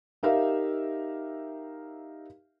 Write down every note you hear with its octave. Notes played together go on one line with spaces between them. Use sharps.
D#4 G4 A#4 E5 F5